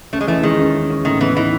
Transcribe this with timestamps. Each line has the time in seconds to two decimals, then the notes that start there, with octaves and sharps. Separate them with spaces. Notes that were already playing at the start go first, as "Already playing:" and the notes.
0.13 A3 C#4
0.21 G#3
0.27 E3 A3
0.43 D#3 G#3
0.59 C#4
0.75 C#4
0.90 C#4
1.05 A2 D#3
1.21 E3 B3
1.37 E3 D#4